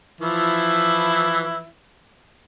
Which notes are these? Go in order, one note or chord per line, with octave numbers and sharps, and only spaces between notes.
E3 F3 E4